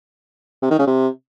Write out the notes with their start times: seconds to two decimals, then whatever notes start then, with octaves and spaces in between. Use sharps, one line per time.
0.62 C3
0.70 D#3
0.79 C#3
0.87 C3